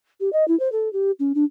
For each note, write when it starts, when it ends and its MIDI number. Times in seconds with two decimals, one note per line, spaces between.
0.20 0.32 67
0.33 0.47 75
0.48 0.58 64
0.60 0.71 72
0.72 0.91 69
0.93 1.11 67
1.19 1.32 61
1.35 1.44 62